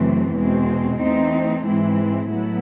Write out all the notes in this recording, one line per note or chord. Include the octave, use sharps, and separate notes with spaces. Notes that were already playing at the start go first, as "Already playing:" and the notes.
Already playing: F#2 C#3 E3 A3 C4
E2 B2 G#3 C4
E3 A3 C4 D#4
G#2 E3 G#3 C4 E4
A2 F#3 B3 E4